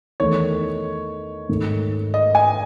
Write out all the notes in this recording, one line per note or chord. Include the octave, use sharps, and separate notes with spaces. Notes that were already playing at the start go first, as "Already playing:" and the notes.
E2 D#3 A3 C#5
G#2 D#3 A3
D#5
G#5